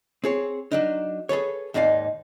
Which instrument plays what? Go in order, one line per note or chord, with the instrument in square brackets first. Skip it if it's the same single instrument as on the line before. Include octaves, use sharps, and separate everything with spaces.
[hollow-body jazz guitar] C4 G#4 C#5
F#3 D4 D#4
G#4 A4 B4 C#5
D#2 G#2 D#4 D5 F5